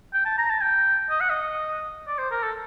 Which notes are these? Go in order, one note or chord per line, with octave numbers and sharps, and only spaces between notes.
G5
A5
A#5
A5
G5
D#5
F#5
D#5
D5
C5
A#4
A4